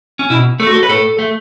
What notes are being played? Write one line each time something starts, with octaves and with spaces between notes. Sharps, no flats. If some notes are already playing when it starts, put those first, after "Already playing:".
C#4
B2 E4
A3 A4
F#4
A4
B4
A2 A4
A3